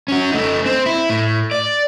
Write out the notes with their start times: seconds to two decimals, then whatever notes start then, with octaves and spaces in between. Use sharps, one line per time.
0.08 C#4 F#4
0.32 A3 D#4
0.65 C4
0.86 E4
1.10 A2
1.51 D5